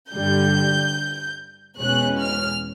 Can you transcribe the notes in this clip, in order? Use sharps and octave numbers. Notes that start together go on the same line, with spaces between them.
G2 D3 G3 G6
E2 B2 G#3 C#4 F#6
F6